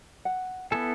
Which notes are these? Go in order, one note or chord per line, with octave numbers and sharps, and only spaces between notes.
F#5
B3 E4 A4 G#5